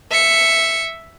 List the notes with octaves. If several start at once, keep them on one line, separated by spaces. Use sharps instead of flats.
E5 C#7